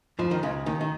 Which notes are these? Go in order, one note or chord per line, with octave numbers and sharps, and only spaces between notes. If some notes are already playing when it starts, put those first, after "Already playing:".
F2 F3
D#3
C#2 C#3
D#2 D#3
D#3